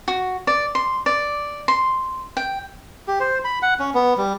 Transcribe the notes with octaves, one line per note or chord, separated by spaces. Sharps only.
F#4
D5
C6
D5
C6
G5
G4
C5
B5
F#5
C#4
B3
G3